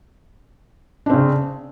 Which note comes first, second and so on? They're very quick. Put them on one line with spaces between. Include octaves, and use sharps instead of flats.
D4 C4 C#3